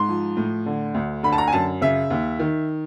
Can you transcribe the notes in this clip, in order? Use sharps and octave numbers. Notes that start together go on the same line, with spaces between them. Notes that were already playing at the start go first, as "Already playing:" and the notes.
Already playing: G#2 C6
F3
A2
D3
D2
D3 B5
A5
A#5
G#5
F#2 A5
C#3 E5
D#2
D#3